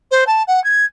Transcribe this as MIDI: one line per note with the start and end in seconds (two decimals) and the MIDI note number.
0.11 0.24 72
0.27 0.42 81
0.47 0.62 78
0.64 0.85 92